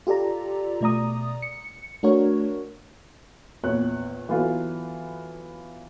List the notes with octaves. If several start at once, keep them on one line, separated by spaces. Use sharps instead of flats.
F4 G4 A4 D5 A#5
B2 A3 D5 A#5 D#6
C#7
A3 D4 F#4 A#4 C#5
A#1 E2 C#5 F#6
E3 F#3 B3 F4 A4